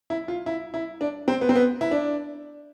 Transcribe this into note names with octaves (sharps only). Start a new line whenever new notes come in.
E4
F4
E4
E4
D4
C4
B3
C4
B3
E4
D4